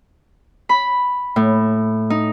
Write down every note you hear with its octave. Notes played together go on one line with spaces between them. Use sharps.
B5
A2
D#4